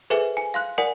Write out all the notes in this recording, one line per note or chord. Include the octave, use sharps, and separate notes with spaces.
G#4 A4 B4 C5 E5 G#5
G#5
F5 C6 F#6
A#4 D5 F#5 G#5